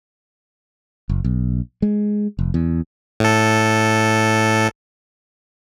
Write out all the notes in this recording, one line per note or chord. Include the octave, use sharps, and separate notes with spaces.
F#1
B1
G#3
F1
E2
A2 A4